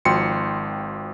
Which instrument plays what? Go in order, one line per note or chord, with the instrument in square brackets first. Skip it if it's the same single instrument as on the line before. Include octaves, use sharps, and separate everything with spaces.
[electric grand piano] G#1 F3 F#4 G5 C6 C#7